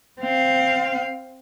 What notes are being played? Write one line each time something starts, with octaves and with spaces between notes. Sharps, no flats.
C4 F5